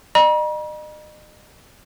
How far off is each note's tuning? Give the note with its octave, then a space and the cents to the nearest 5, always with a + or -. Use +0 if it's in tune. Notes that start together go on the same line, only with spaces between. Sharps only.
D#5 -40 A#5 +45